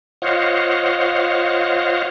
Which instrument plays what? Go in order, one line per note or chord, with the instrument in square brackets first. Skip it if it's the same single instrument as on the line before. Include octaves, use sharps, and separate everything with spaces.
[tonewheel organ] F4 C5 C#5 D#5 F5 F#5